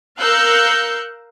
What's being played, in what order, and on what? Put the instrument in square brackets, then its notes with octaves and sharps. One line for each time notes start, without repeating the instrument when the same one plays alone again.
[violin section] A#4 F5 E6 F#6 G6 C#7